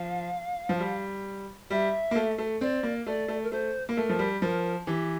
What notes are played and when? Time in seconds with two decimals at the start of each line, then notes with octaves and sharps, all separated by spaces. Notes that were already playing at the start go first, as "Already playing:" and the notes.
Already playing: F3 F5
0.69 F3
0.80 G3
1.70 G3 E5
2.11 A#3
2.15 A3
2.38 A3
2.61 C4 D5
2.83 A#3
3.06 A3 D5
3.28 A3
3.43 A#4
3.52 A3 C5
3.89 A#3
3.96 A3 A#4
4.09 F3
4.19 G3
4.42 F3 A#4
4.87 E3 G4